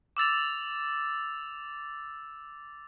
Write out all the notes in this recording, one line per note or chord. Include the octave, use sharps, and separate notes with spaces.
D6 E6 A6 F7